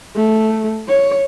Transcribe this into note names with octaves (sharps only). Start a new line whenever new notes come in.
A3
C#5